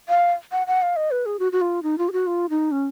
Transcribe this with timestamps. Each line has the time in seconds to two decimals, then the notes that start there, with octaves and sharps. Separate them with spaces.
0.09 F5
0.52 F#5
0.67 F#5
0.82 F5
0.96 D#5
1.11 B4
1.26 G#4
1.39 F#4
1.52 F#4
1.61 F4
1.83 D#4
1.98 F4
2.09 G#4
2.13 F#4
2.27 F4
2.50 D#4
2.71 C#4